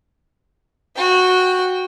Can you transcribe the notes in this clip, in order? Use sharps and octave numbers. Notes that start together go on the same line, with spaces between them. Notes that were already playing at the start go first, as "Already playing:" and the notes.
F#4 G5